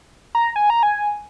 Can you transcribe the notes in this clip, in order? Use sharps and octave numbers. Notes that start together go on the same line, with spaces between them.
A#5
G#5
A#5
G#5